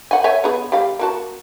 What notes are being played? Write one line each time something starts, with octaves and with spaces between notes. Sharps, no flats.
F#5 G#5
C#5 E5 G#5
B3 G#4
G3 F5
A#3 F#4 A5